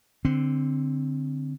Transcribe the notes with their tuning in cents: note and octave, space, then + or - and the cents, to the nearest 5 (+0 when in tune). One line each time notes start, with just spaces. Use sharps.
D3 +0 C4 +0